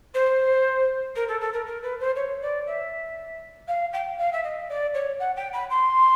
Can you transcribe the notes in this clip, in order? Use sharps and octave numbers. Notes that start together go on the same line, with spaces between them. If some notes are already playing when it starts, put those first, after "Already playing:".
C5
A#4
A4
A4
A#4
A#4
B4
C5
C#5
D5
E5
F5
G5
F5
E5
D#5
D5
C#5
F#5
G5
B5
C6